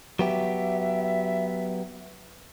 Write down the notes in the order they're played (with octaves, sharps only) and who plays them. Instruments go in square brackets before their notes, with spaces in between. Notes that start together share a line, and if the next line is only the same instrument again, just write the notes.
[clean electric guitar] F#3 B3 G4 [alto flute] E5